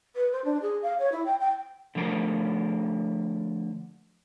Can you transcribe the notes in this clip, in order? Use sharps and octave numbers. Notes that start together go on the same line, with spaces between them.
B4
C5
D4
G#4
F5
C#5
E4
G5
G5
D3 F3 A3 A#4 C5